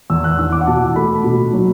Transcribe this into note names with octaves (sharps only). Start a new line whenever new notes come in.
E2 E6
F#6
E3 E6
D6
F#5
B2 A5
A3 B5
B2
F#3